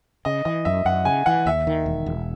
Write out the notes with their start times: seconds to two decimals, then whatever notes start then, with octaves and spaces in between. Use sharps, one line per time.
0.25 C#3 D#5
0.45 E3 D#5
0.65 F#2 E5
0.85 F#2 F#5
1.05 C#3 G#5
1.26 E3 F#5
1.46 D#2 E5
1.67 D#3
1.86 E1
2.06 E1